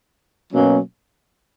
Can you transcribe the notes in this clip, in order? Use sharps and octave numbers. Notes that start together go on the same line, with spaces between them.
B2 F#3 A#3 C#4